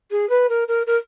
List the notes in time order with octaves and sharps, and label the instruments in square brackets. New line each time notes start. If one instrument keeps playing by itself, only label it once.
[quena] G#4
B4
A#4
A#4
A#4